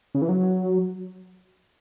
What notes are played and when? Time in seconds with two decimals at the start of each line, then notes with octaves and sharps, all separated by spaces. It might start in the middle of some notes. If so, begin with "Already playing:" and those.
0.15 C#3
0.22 E3
0.29 F#3